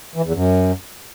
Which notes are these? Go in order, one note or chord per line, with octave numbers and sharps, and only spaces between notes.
E3
E2
F#2